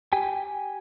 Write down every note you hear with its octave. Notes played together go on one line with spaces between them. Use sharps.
G4 G5 G#5